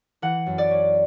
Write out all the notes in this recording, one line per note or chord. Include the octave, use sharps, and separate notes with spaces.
E3 F#5
F#2
D5
C#4